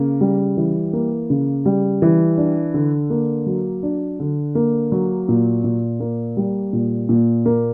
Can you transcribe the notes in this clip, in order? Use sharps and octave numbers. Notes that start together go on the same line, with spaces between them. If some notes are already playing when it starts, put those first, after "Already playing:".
Already playing: C#3 A#3
G3
E3
A#3
C#3
G3
E3
D4
D3
A#3
F#3
D4
D3
A#3
F#3
A#2
A#2
A#3
G3
A#2
A#2
A#3